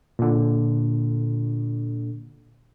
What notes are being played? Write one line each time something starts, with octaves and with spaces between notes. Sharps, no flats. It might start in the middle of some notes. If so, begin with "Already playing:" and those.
A#2 D3